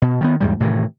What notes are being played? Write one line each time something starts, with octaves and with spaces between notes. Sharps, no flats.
B2
D#3 F#3 B3
E2 G#2 G3
A2 C3 D#3 E3